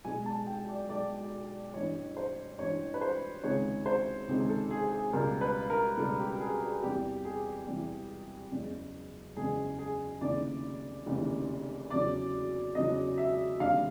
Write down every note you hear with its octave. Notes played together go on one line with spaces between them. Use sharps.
B1 B2 G#3 G#5
A5
G5
D5
B1 B2 G#3 D5
A1 G2 E3 C#5
C5
A1 G2 E3 C#5
B4
C5
C#2 C3 D#3 G#3 C#5
C5
C#2 C3 D#3 G#3
A4
G#4
G#4
C#2 B2 G3 A#4
B4
A#4
C#2 B2 G3 A4
G4
G#4
G#4
E2 C3 E3 G3 G4
G#4
E2 C3 E3 G3
F#1 E2 C#3
F#1 E2 C#3 G#4
G#4
F1 D#2 C#3 E3 D5
F1 D#2 C#3 E3
E2 C#3 F#3 D5
E2 C#3 F#3 D#5
E5
F1 D#2 D3 G3 F5